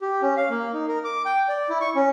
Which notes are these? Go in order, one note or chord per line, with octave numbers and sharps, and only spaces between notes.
G4
C#4
F5
A#3
D#4
A#4
D6
G5
D5
E4
C#6
C#4